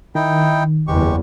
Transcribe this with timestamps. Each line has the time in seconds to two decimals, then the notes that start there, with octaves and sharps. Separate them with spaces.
0.15 D#3 D#4 E4 G5
0.87 F#1 E2 G#3 G4 C#6